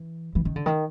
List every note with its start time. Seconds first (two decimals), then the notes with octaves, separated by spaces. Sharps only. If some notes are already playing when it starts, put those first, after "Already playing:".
Already playing: E3
0.35 E3
0.45 D#3
0.56 D3
0.66 D#3